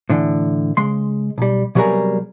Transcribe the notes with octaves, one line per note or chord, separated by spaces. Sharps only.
A2 D3 E3
C#3 G#3 C6
B1 G3
C3 F#3 G3 B3 G#4 A#4